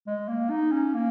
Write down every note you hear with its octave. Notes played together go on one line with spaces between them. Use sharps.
G#3
A#3
D#4
C#4
A#3